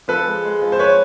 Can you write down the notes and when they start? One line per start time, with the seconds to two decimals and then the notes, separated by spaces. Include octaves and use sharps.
0.08 F3 A4 B4
0.26 G#3
0.45 G#3
0.62 F3
0.72 C5
0.79 B4 C#5